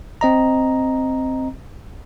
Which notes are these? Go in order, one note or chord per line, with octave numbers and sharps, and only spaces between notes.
C4 D#5 A#5